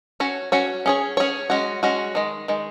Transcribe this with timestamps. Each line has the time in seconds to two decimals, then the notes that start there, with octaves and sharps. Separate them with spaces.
0.20 C#4 F#4 C#5
0.52 C#4 F#4 C#5
0.86 C#4 G#4 C#5
1.17 C#4 G#4 C#5
1.50 G#3 C#4 F#4
1.83 G#3 C#4 F#4
2.15 D#3 G#3
2.48 D#3 G#3